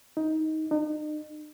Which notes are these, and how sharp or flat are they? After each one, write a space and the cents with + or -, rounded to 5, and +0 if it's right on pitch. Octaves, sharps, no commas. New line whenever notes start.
D#4 +15
D#4 -40